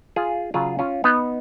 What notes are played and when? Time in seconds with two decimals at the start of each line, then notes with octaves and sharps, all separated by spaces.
0.16 F4 G#4
0.54 C#3 F#3 F4 G#4
0.79 C#4 F4
1.04 B3 D#4